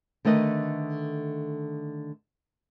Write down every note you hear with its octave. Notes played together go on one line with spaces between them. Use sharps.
D3 D#3 A3 B4 D#5